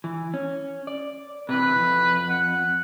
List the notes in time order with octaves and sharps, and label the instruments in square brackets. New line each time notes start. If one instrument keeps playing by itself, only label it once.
[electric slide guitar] E3
C#4
D5
[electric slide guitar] C3 E3 [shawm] B4
[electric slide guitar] F2
[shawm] F#5